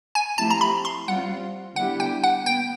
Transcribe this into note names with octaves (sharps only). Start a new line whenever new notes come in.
G#5
F3 A3 C4 E4 G4 A5
A#5
B5
C6
G3 C4 F4 F#5
D3 G3 B3 E4 G4 F#5
G5
F#5
B3 G5